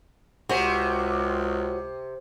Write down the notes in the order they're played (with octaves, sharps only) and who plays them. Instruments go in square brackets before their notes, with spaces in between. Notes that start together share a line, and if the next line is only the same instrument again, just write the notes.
[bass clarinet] C#2 [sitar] C3 [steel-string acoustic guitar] F#4 C5 C#5